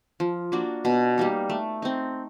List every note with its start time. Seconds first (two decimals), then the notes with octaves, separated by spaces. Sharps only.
0.20 F3
0.52 A#3 D4 F#4
0.85 B2
1.18 G3 A#3 D#4
1.50 A3
1.82 C4 D#4